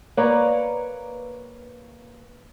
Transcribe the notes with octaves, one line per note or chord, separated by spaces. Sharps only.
A#3 B4 C#5 D5 A#5